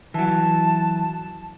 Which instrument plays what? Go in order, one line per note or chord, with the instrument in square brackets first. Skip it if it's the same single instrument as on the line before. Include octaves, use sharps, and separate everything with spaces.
[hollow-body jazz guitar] E3 F#3 [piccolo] A5